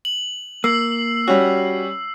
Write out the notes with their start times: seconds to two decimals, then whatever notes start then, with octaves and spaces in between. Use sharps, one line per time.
0.05 F#7
0.64 A#3 E6 C7
1.28 G3 C#4 F#4